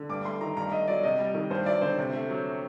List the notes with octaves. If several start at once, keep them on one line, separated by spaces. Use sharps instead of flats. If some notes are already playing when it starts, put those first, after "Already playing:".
Already playing: D3
G2 D6
A3 C6
D#3 A#5
G2 A#5
A3 D#5
F#3 D5
C3 D#5
G3
D#3
G2 C5
F#3 D5
D3 C5
C3
A3
F#3